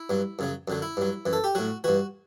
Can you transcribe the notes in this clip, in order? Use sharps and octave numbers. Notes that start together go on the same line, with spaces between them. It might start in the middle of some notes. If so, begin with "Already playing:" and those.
Already playing: E4
G2 F#3
F#2 C#3 F#3
F#2 D3 F#3
E4
G2 F#3
F#2 E3
A4
G4
A2 F#3 F#4
G2 E3 F#4